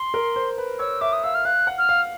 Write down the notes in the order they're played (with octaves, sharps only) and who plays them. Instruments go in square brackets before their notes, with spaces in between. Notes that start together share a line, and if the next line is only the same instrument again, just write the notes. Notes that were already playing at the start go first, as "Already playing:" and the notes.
Already playing: [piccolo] C6
[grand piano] A#4
C5
B4
[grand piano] C#5 [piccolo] E6
[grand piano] E5 [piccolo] D6
[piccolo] D#6
[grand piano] F5 [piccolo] E6
[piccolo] F6
[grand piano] F5 [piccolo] F#6
[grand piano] F#5
[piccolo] F6
[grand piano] F5